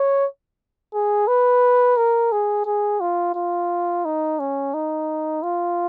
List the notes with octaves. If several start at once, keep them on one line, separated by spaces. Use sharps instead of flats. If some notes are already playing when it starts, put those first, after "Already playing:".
Already playing: C#5
G#4
B4
A#4
G#4
G#4
F4
F4
D#4
C#4
D#4
F4